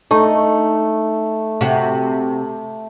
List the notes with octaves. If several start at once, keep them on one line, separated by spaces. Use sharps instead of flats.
A3 D#4
C3 F#4